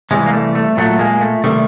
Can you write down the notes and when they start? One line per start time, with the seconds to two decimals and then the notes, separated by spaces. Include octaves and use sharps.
0.11 C3 E3 G3 G#3
0.26 A#3
0.33 A3
0.55 A3
0.77 A#2 F#3 A3
0.99 G#3 A#3
1.21 A3
1.44 C3 D#3 G3 A3